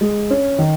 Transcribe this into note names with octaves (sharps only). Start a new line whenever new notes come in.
G#3
C#4
D#3